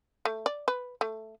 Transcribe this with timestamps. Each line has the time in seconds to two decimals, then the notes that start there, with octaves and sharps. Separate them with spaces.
0.25 A3
0.46 D5
0.68 B4
1.01 A3